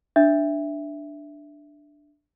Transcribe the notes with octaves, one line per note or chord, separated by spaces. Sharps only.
D4 E5